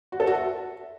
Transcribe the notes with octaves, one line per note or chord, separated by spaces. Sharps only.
F#4
A4
F#4
E5